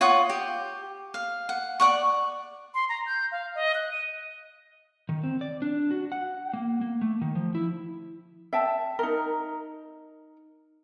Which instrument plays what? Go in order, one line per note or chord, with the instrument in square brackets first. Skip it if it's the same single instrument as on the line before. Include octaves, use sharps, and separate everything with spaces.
[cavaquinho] F4 C#5 F#5 D#6
G4
F5
F#5
D5 F#5 C#6
[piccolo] C6
A#5
G6
F5
D#5
F#6
D#7
[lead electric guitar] D#3
C4
D5
D4
F#4
F#5
A#3
A#3
A3
D#3
F3
E4
[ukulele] E5 G5 A5
D#4 A#4